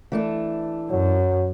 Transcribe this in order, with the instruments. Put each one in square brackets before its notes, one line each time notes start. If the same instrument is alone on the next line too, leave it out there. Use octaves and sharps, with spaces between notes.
[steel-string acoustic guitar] E3 A3 D4
[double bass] F#2 [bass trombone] F#3